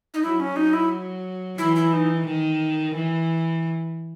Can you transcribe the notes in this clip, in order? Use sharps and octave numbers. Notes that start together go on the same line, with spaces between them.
D#4
F#3 E4
C#4
F#3 D#4
E4
E3 E4
E4
D#4
D#3
E3